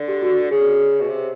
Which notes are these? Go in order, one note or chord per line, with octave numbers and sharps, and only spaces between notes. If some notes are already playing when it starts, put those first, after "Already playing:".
Already playing: D3
G4
F#4
C#3 G#4
B2
C3